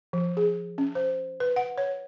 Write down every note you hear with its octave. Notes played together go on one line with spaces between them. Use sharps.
F3
G#4
C#4
C5
B4
F#5
C#5